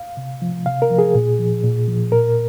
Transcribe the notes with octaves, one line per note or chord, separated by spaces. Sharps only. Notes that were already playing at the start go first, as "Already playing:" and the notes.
Already playing: F5
C3
F3
C3 F5
A#4
F3
G#4
A#2
F3
A#2
F3
A#2 A#4